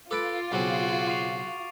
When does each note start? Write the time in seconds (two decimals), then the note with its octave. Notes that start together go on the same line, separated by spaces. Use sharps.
0.11 F4 A4 B4 D6 A6 D7
0.52 B1 C#3 C4 F#4 G#4
1.08 C#6 C7 F7